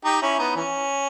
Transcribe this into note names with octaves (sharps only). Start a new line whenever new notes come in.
D#4 G4
C#4 E4
B3 D#4
E3 C#4